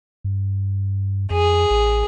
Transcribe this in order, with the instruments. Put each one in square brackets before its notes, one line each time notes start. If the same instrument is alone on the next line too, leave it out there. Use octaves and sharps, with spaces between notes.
[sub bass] G2
[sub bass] F2 [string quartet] G#4
[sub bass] A1